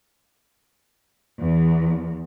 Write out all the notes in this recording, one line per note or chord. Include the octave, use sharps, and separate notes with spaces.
E2